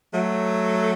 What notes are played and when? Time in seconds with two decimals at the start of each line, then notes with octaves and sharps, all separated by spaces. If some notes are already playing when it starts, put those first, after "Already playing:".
0.13 F#3 A3